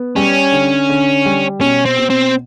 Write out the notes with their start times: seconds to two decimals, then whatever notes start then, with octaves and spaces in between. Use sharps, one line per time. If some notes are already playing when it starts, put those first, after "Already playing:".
Already playing: B3
0.16 G3 C#4
0.52 D3
0.89 D3
1.25 G3
1.61 B2 C#4
1.85 C4
1.98 B2
2.10 C4